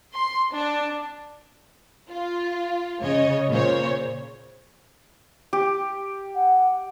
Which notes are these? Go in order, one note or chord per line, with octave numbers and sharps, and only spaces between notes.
C6
D4
F4
C#3 C#5 D#5
A#2 C#3 C5 C#5
G4
F#5